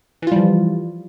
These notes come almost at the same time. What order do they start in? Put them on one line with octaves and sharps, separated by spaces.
E3 F4 G3 F3